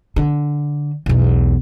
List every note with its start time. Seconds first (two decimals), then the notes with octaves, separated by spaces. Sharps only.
0.16 D3
1.06 B1 E2